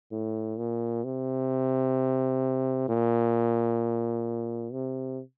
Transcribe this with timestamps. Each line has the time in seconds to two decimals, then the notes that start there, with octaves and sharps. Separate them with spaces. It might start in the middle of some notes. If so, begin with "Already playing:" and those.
0.12 A2
0.58 A#2
1.04 C3
2.89 A#2
4.72 C3